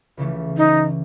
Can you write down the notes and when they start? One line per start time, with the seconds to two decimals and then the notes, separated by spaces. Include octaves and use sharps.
0.17 C#2 C#3 E3 A3
0.57 D#4